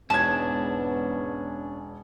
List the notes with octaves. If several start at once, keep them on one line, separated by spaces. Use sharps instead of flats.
E1 E2 G#2 B3 C#4 D4 A5 G#6